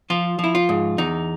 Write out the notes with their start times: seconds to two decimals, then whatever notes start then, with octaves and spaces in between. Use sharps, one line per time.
0.10 F3 F4
0.39 F3 E4
0.55 F4
0.69 G#2
0.98 E2 D#4